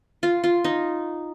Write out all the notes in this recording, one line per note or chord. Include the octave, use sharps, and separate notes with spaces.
F4
F4
D#4